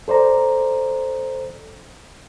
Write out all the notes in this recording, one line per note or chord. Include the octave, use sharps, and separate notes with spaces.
A4 C5 D5 A#5